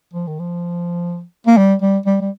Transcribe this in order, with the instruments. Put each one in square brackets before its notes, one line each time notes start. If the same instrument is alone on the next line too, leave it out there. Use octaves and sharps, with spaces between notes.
[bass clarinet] F3
D#3
F3
A#3
G3
G3
G3
G3